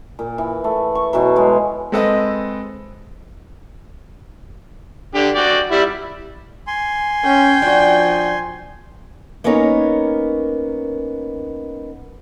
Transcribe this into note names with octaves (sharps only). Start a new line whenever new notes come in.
A#2
E3
A3
C#6
B2 E3 F#3
G#3 C#5
G#3 C4 A4 B4 D#5
D3 G4
F#4 D5 G5
G3 E4
G#5 C6
C#4 G5
F3 D4 F#4
A#3 B3 C#4 D#4 A#4 C#5